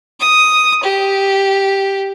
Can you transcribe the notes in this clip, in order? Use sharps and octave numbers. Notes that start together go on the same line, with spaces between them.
D#6
G4